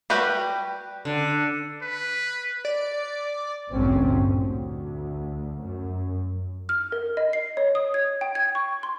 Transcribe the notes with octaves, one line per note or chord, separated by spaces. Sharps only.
G3 F#4 G4 B4
D3
B4
D5
A1 D2 G2 A#2 C4 C#4
D2
F#2
F6
A#4
D#5
C7
C#5
D#6
G#6
G5
G#6
C#6
C6